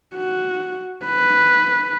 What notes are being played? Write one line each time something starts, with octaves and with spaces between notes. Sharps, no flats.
F#4
B4